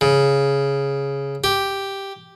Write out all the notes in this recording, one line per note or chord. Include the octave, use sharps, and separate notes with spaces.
C#3
G4